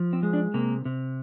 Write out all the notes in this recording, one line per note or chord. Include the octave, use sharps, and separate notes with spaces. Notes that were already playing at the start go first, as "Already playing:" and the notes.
Already playing: F3
C4
G#3
D4
C3 A#3
C3